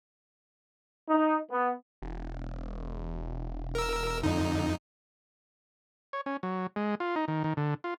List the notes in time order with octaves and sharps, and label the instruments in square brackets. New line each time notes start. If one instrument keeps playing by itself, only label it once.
[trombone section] D#4
B3
[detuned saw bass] E1
[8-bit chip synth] A#4 E6
[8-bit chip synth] F2 D#4 [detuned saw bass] D3
[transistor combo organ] C#5
C#4
F#3
G#3
F4
D#4
D#3
D#3
D3
F4